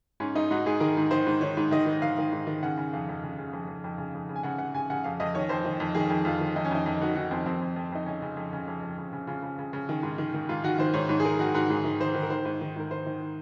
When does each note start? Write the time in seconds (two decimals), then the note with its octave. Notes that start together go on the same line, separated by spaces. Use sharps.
0.20 G#2 C#4
0.35 G#2 D#4
0.50 G#2 F#4
0.66 G#2 G#4
0.80 D#3 A#4
0.97 G#2
1.11 D#3 C5
1.26 G#2
1.41 D#3 C#5
1.57 G#2
1.71 D#3 D#5
1.86 D#3
2.02 D#3 F5
2.18 D#3
2.32 G#2
2.47 D#3
2.63 C#3 F#5
2.77 C#3
2.93 F2 F5
3.09 F2
3.23 C#3
3.38 C#3
3.53 F2
3.68 F2
3.84 F2
3.98 C#3
4.14 F2
4.29 C#3
4.36 G#5
4.43 C#3 F#5
4.59 C#3 F#5
4.74 C#3 G#5
4.90 C#3 F#5
5.04 F2 F5
5.20 F2 D#5
5.35 D#3 C#5
5.49 F2 C5
5.65 D#3
5.80 F2
5.95 D#3 G#4
6.10 F2
6.25 F2 F4
6.41 D#3
6.56 F2 D#4
6.65 C#4
6.71 F2 D#4
6.86 F2
7.01 D#3 F#4
7.16 D#3 F#4
7.31 F2 C4
7.46 F2 C4
7.62 F2
7.76 F2
7.92 F2 D#4
8.06 C#3 C#4
8.22 C#3
8.37 F2
8.53 C#3
8.68 F2
8.83 F2
8.98 C#3
9.13 C#3
9.27 C#3 F4
9.42 C#3
9.59 C#3
9.73 C#3
9.89 D#3
10.03 G#2
10.18 D#3
10.34 D#3
10.49 G#2 F4
10.64 D#3 F#4
10.78 D#3 C5
10.94 G#2 C#5
11.09 G#2 C#5
11.20 G#4
11.25 G#2 A#4
11.39 D#3 F#4
11.54 G#2 F#4
11.70 G#2 G#4
11.85 D#3
12.00 D#3 C5
12.15 D#3
12.23 A#4
12.30 D#3 C5
12.45 G#2
12.61 D#3
12.76 G#2 A#4
12.91 D#3 C5
13.06 D#3